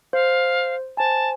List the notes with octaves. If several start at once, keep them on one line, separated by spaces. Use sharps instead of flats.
C5 F5
C5 G#5 A5